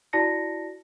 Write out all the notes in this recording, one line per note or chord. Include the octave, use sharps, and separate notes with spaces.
E4 F#4 D5 A5 A#6 C#7